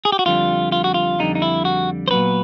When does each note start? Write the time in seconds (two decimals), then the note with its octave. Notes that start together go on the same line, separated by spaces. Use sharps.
0.05 G#4
0.12 G4
0.19 F#4
0.26 F2 D3 G3 F4
0.72 F4
0.84 F#4
0.94 F4
1.19 F2 D3 G3 D#4
1.35 D#4
1.42 E4
1.65 F#4
2.08 C5
2.11 A#2 F#3 B3 B4